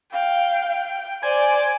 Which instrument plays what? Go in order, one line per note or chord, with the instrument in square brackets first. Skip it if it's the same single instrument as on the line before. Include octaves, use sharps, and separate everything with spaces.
[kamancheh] F5 [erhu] G5
[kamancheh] C5 [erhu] D5 [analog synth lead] G#5